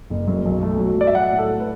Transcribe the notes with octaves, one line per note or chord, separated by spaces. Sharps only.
F#1
F#2
B1
A3
F#3
F#3 D5
E5
F#3 F#5
A2
A4
A3
B4